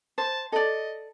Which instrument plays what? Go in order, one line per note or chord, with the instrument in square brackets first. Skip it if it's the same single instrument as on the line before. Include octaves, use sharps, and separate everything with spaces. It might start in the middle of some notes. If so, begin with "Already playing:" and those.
[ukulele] C5 [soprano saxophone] A5
[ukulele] A4 D5 [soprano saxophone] D#5